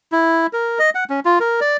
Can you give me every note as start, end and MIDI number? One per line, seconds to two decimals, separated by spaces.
0.12 0.47 64
0.53 0.79 70
0.79 0.90 75
0.95 1.04 78
1.10 1.20 61
1.25 1.39 65
1.40 1.60 70
1.61 1.77 74